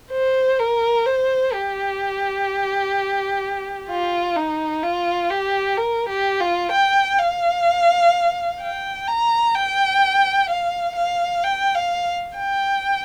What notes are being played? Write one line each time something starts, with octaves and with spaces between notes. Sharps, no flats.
C5
A#4
C5
G4
F4
D#4
F4
G4
A#4
G4
F4
G5
F5
G5
A#5
G5
F5
F5
G5
F5
G5